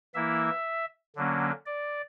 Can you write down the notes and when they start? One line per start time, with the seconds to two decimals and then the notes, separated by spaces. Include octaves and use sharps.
0.14 E3 A#3 E4 E5
1.15 D3 F#3 A#3 C#4
1.66 D5